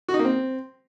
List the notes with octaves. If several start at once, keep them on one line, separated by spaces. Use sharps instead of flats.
F#4
D#4
A#3
C4